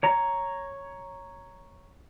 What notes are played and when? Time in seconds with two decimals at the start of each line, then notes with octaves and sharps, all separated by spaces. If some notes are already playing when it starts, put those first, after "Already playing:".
0.03 C#5 A#5